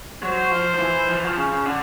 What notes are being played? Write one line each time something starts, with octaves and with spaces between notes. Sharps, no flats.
F#3 C5
F3
F3
E3
F3
E3
F3
C#3
D3